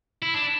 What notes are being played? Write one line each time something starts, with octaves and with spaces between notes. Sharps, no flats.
E4
D4